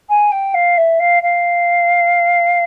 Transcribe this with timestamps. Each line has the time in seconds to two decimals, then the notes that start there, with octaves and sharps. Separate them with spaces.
0.09 G#5
0.31 G5
0.54 F5
0.77 E5
0.99 F5
1.22 F5